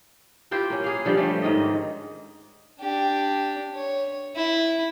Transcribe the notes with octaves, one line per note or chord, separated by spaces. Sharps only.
E4 F4 G4 C5
A#3 C#4
G#4 F5
D3 F3 G3
D3 F3 A3 C#4
G#2 D#3 D#5
D4 G4
C#5
E4